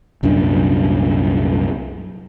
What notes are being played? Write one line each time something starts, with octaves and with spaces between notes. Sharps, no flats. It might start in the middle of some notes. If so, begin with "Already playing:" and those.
C2 F#2 A#2 D4